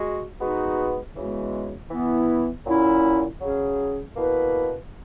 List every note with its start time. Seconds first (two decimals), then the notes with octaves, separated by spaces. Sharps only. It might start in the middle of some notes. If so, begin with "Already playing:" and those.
Already playing: G#3 F#4
0.40 G#3 B3 D#4 F#4 B4
1.15 C#3 E3 G#3 B3 F#4
1.91 E3 B3 E4
2.66 A#2 F#3 C#4 E4
3.41 C#3 F#3 C#4 G#4
4.16 B2 A#3 E4 B4